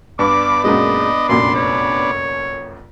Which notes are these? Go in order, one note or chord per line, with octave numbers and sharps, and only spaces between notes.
G2 B3 D4 D6
F#2 A#2 G#3 D#5
F1 A#1 F#2 C6
C#5